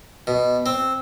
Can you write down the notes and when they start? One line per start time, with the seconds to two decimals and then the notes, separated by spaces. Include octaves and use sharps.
0.27 B2
0.66 C4